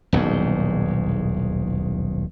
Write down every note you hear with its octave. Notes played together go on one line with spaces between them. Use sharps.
D#1 B1 E2 G#2